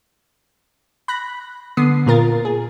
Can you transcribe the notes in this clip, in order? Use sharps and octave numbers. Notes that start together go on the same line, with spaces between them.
B5 F#6 A#6
D3 B3 D#6 C7
A#2 F4 A#4 A6
G#4